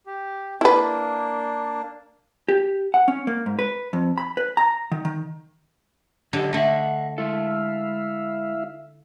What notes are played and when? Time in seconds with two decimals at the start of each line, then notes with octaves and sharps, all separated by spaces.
0.06 G4
0.61 A#3 D4 E4 B4
2.49 G4
2.94 F#5
3.08 C#4
3.27 A#3
3.46 G#2
3.59 B4
3.93 F2
4.18 B5
4.37 B4
4.57 A#5
4.92 D#3
5.05 D#3
6.33 D3 F#3 G4 D#5
6.53 D3 A3 D#5 E5 F#5
7.18 G#3 E4 A4 E5 F5